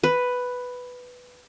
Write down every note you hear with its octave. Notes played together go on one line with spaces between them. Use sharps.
B4